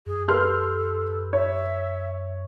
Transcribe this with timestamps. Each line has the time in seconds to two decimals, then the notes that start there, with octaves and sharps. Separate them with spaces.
0.06 F#2 G#4
0.28 G4 A4 B4 C6 F6 G6
1.33 C#5 E5